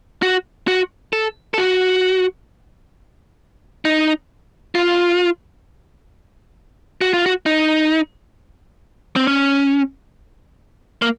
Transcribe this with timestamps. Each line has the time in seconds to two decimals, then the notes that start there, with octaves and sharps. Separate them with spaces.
0.22 F#4
0.68 F#4
1.13 A4
1.54 A4
1.58 F#4
3.85 D#4
4.75 F4
7.01 F#4
7.14 F4
7.26 F#4
7.46 D#4
9.16 C4
9.27 C#4
11.02 A#3